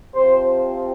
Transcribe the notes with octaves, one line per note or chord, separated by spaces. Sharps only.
C3 F3 C4 C5